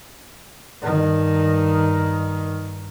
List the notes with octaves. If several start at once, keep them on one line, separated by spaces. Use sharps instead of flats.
G2 D#3